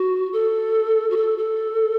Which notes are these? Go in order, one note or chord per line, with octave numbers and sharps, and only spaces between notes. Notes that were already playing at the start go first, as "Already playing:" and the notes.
Already playing: F#4
A4
F#4
A4
A4